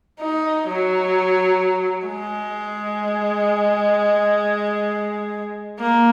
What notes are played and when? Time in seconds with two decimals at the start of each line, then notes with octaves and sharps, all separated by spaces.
0.21 D#4
0.68 F#3
2.07 G#3
5.80 A#3